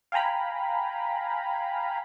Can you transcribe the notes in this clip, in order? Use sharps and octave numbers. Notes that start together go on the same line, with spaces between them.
F5 G5 G#5 A#5 B5